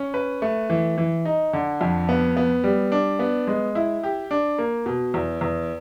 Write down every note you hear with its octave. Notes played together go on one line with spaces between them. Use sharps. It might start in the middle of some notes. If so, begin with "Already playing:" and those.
Already playing: C#4
B4
A3
E3
E3
D#4
D3
F2
B3
B3
G3
D4
B3
G#3
E4
G4
D4
A#3
B2
E2
E2